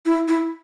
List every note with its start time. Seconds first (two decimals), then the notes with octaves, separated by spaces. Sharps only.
0.06 E4
0.28 E4